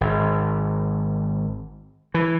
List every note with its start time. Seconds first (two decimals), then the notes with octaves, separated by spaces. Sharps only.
0.01 G#1
2.14 E3